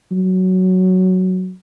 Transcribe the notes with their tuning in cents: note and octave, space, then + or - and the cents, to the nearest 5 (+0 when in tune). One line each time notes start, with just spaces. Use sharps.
F#3 +5